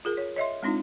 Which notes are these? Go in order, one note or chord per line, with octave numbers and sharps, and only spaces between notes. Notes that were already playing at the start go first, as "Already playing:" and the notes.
F4 G#4 A#4
C#5
C#5 D#5 E5 C6
G#3 C4 D4 D#4 F4